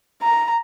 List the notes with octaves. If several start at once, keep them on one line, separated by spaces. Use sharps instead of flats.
A#5